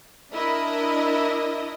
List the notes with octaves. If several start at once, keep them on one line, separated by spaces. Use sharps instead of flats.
D4 E4 A#4 D#5 E5